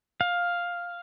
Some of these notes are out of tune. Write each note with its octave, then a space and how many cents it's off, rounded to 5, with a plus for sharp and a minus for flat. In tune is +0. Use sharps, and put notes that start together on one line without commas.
F5 +5